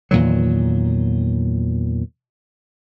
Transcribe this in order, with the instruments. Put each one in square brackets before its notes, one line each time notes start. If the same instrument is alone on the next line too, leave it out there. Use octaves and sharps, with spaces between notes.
[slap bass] E2 A#2 D#3 F#3